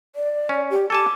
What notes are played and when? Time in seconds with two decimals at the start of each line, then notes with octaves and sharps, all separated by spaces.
0.16 D5
0.49 C#4
0.70 G4
0.90 A4 G#5 A5 D6